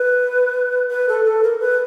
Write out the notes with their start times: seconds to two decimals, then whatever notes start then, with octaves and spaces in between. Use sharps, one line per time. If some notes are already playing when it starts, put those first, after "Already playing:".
Already playing: B4
0.90 B4
1.09 A4
1.25 A4
1.43 A#4
1.60 B4